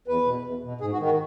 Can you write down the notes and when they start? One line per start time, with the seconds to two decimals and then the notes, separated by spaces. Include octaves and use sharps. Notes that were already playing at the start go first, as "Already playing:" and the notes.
0.08 E2 B4
0.26 B2
0.44 E2
0.63 B2
0.81 G#2 G#4
0.93 F#4
1.00 D#3
1.05 F#4